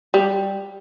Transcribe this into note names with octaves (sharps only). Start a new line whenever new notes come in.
G3